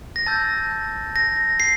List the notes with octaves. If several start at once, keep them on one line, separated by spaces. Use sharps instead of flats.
A#6
A5 E6 G6 A6
A#6
C7